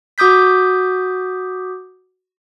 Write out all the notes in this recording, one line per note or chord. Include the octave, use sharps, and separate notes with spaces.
F#4 D6 D#6 G6 B6